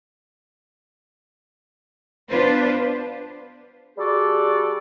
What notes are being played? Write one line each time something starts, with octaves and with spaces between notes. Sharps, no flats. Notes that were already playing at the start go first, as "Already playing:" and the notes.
B3 D4 F4 B4 C5
G3 F#4 G#4 A4 D5